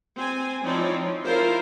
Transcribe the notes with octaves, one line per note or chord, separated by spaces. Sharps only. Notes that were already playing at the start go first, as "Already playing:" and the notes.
C4 G#5
F3 C4 D#4 E4 C#5 D5
F3
E4 F4 A#4 C5 F5